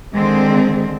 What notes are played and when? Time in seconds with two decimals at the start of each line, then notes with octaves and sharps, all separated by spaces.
0.13 D3 D#3 G#3 C4